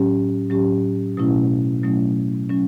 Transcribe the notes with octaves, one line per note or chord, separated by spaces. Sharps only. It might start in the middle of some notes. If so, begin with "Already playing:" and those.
Already playing: A2 F#3 C#4 G4
A2 F#3 C#4 G4
B2 F#3 A3 C#4 E4
B2 F#3 A3 C#4 E4
F#3 C#4